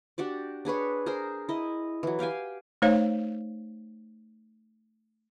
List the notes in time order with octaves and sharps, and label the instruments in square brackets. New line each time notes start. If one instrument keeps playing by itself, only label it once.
[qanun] D4 F#4 G4 D5
D4 G#4 B4 C#5
G#4 A#4 C5
E4 D#5
E3 F#3
G4 F5 G5 G#5
[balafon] A3 D#4 C5 C#5 F5